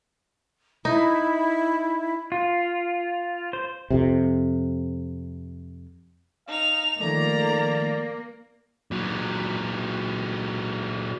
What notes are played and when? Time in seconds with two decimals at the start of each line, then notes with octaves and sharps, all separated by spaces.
0.85 D#4 E4
2.32 F4
3.53 C5
3.90 F2 C3
6.47 D#4 F5 F7
7.00 D#3 F3 A3 A#3 D5 A#5
8.91 A#2 F#3